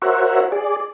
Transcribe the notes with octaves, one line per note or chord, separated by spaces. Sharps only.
F#4 A#4 C5 C#5 E5 F#5
G#4 D5